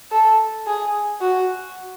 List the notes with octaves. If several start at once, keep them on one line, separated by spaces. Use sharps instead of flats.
A4
G#4
F#4